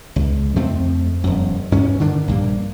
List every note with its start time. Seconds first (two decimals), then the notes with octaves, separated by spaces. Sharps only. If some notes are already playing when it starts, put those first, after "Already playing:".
0.16 C#2
0.56 F2 F3 A3 C4
1.24 E1 F#2
1.72 G2 C#4
2.00 D3 D#3 D4
2.27 A#1 G2 A#3